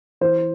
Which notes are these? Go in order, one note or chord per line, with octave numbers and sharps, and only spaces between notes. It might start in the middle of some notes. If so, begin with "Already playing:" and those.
E3 C5